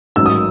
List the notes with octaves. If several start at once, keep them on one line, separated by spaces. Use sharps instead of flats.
A1 G#2 D#3 F#3 E6
D#6